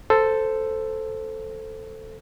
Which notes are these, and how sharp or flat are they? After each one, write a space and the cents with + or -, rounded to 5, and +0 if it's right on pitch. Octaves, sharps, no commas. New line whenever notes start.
A4 +5 C5 -5